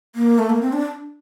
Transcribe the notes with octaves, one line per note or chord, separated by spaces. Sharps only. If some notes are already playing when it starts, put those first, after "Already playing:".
A#3
A3
A#3
C4
D4